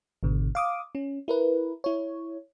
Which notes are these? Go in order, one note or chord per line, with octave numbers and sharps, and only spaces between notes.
G#1 B2 D3
F5 D6 D#6
C#4
E4 A#4 B4
E4 C#5